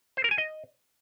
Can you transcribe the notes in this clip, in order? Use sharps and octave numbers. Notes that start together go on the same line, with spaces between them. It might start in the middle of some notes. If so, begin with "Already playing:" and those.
C5
A#4
G#5
D#5